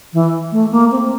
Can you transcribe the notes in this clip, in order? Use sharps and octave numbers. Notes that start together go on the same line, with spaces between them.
E3
A3
A#3
C4